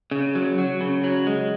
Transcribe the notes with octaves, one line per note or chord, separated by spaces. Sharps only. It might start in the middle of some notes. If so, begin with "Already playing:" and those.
C#3
F#3
F#3
C#3
F#3
G#3